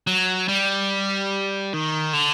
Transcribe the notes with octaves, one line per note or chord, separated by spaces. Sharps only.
F#3
G3
D#3
D3